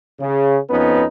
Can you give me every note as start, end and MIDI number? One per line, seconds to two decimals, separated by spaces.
0.20 0.58 49
0.70 1.04 41
0.70 1.04 59
0.70 1.04 61
0.70 1.04 63
0.70 1.04 71